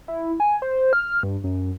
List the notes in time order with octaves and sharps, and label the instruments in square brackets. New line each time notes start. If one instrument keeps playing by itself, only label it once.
[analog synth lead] E4
G#5
C5
F6
G2
F#2